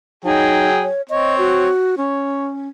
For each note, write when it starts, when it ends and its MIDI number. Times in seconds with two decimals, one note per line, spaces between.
0.24 0.86 54
0.24 0.69 63
0.24 0.86 68
0.24 0.86 79
0.83 1.02 73
1.09 1.69 60
1.09 1.69 73
1.09 1.37 75
1.38 1.95 66
1.98 2.69 61
1.98 2.50 73